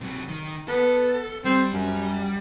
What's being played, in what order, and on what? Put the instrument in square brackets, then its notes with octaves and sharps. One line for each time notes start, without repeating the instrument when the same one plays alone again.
[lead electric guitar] C3 F#3
D#3
[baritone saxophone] B3 [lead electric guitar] A4
[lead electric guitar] G3 [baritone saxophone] C4
[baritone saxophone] F#2